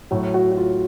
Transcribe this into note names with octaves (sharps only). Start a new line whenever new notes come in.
A2 F#3 F#4
F#3 F#4
F#4
F4